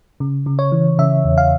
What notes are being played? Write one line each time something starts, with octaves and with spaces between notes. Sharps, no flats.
C#3
C#3
C#5
E3
C#3 E5
E2
F5